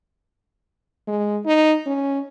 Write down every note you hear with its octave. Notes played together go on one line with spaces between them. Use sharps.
G#3
D#4
C#4